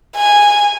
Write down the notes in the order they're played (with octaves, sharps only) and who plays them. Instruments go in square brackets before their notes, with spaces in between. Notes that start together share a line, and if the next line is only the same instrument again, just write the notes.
[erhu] G#5